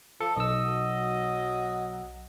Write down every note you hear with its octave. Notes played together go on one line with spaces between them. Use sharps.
F3 A4
B1 C#5 D#5 E6
F#3